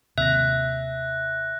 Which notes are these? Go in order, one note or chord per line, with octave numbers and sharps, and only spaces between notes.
D#2 C3 E5 F#6 A#6